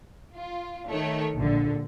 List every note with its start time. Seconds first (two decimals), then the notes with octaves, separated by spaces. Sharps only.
0.37 F4
0.88 D#3 A3 C#5
1.35 A#1 D3